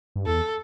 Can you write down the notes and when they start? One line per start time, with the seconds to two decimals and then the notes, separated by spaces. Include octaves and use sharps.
0.16 G2
0.26 E2 A4